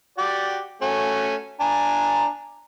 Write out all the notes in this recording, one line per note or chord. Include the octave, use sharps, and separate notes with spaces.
F#4 G4 D5
A3 C#4 F#4
D4 G#5 A#5